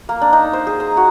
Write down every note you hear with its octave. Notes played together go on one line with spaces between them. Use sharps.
A#3
D4
D#4
C5
G#4
A#5
F#4